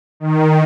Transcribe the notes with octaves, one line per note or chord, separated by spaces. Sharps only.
D#3